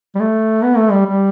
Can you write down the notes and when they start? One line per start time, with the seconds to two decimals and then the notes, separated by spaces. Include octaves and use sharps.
0.15 G3
0.20 A3
0.63 B3
0.77 A3
0.92 G3
1.06 G3